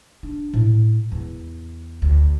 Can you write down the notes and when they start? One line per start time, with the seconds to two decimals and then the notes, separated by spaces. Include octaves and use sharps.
0.23 D4
0.54 A2
1.12 E2
2.02 D2